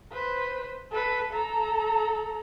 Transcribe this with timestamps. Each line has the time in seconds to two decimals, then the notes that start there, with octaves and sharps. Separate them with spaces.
0.12 B4 C5
0.91 A4 B4
1.33 A4 A#5